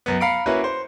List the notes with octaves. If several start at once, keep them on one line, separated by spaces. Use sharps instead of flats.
F#2 B3
F5 A#5 B5 C#7 D7
A#3 C#4 E4 F#4 B4
C5